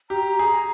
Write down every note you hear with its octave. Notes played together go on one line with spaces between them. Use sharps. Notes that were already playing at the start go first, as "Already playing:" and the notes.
G4 A#5
G#4